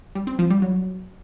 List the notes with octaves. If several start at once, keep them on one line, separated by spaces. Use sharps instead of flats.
G3
C4
F3
G3
F#3